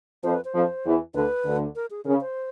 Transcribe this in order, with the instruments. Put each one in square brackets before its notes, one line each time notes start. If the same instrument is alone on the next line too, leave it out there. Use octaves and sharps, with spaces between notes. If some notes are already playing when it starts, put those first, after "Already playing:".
[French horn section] F2 F3 [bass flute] C5
[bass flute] B4
C5
[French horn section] F2 F3
E2 E3
[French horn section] D2 D3 [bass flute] B4
[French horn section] D2 D3
[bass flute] A#4
G#4
[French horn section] C#3 [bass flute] A#4
[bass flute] C5